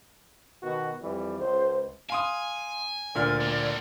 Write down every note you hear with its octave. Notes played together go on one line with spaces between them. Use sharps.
B2 D#3 F#4
F2 E3 G3
C#2 C5
F5 G#5 C6 D#6
D2 A#2 D5 F6
A2 A#3